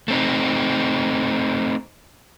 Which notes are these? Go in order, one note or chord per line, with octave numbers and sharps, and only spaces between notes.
A3 C4 D#4